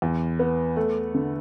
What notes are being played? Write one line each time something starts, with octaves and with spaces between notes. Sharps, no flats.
E2
B3
A3
D3